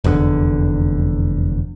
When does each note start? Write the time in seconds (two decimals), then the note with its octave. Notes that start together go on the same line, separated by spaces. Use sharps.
0.04 F1 E2 A#2 D3